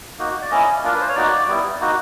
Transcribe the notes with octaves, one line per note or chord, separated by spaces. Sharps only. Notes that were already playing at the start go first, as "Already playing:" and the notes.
A#3 D#4 F#4
D5
A#3 C#4 E4 D#5
A#3 D4 F4 A#4
B4
C5
C#5
A#3 D#4 F#4 D5
G3 B3 E4
A#3 D#4 F#4